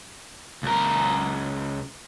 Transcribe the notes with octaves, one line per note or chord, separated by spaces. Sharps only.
C#2 A#4